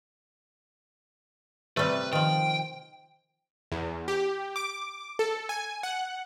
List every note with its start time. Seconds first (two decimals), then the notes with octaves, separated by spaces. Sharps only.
1.77 C3 G3 A3 B4
2.13 D#3 F3 G5
3.72 E2
4.08 G4
4.56 D6
5.19 A4
5.49 G#5
5.83 F#5